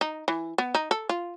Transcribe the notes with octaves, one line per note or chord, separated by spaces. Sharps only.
D#4
E3
B3
D#4
A4
F4